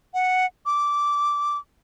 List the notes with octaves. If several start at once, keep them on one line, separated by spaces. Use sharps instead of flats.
F#5
D6